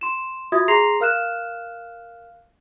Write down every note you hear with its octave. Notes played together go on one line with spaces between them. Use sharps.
C6 E7
F4 F#4 E5 D#6 G#6
G#4 A#5 C6 A#6 C7 F7
A#4 F5 F6 F#6 E7